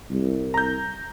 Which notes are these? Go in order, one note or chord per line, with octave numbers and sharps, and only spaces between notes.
C2
A#5 G6